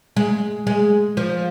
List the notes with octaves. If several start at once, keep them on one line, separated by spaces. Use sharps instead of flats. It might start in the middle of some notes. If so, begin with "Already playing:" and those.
G#3
G#3
F3